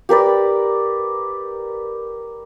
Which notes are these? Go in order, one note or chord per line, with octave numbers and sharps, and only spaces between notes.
G4 A#4 B4 D5